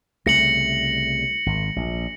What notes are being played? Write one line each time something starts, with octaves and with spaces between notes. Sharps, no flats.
C2 C#3 A3 A#6 C#7 F#7
G#1
A#1